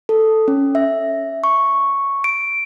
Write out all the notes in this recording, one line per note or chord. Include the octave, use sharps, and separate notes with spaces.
A4
C#4
E5
C#6
D7